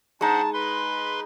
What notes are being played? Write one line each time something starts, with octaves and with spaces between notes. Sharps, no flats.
G#3 D4 D#4 C5 F#5 A5
B4 B5 C6